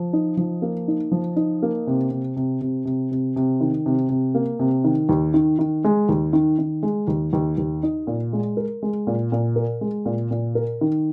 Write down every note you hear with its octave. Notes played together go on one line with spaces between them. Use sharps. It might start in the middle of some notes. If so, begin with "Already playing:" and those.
Already playing: F3
D#4
F3
A#3
D#4
F3
D#4
A#3
C3
C3
C3
C3
C3
C3
C3
D#3
C3
C3
A#3
C3
D#3
D#2
D#3
D#3
G#3
D#2
D#3
D#3
G#3
D#2
D#2
D#2
D#4
A#2
G#3
A#4
G#3
A#2
A#2
A#4
G#3
A#2
A#2
A#4
D#3